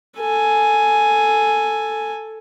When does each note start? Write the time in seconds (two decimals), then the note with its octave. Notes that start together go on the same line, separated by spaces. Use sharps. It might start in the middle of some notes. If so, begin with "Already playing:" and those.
0.19 A4 G#5